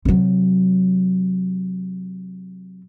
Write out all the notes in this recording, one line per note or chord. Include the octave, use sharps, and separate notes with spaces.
C3 F#3